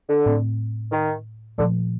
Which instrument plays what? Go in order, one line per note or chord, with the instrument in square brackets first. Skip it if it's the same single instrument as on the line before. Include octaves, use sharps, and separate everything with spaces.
[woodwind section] D3
[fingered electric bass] A2 A3 C4
[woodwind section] D#3
[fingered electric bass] A#2 F3 A3 [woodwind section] D3